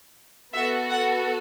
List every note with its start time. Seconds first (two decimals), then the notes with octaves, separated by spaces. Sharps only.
0.53 B3 F#4 A4 E5
0.90 F#5